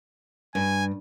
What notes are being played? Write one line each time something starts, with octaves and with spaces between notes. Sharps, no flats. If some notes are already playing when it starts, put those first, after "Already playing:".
G2 G#5